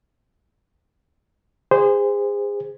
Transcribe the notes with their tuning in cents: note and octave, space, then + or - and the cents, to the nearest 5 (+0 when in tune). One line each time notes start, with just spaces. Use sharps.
G#4 -30 C5 -20